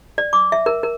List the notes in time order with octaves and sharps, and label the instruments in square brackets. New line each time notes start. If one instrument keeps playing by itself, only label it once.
[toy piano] D5
D6
E5
A#4
A#4